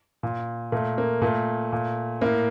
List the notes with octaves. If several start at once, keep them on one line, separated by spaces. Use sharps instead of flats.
A#2
A#2 A3
A#3
A#2 A3
A#2
A2 A#3